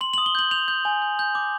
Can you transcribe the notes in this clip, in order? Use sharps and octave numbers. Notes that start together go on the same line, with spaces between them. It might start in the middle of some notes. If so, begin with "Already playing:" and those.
C6 F#7
F#7
D#6
G7
G6 F#7
G6 F7
G6
G#5
G6
G6
D6